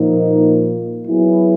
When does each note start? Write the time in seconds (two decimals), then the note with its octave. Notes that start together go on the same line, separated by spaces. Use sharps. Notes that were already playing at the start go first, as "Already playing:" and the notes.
Already playing: A#2 F3 A#3 D#4
1.05 F#3 B3 E4 G#4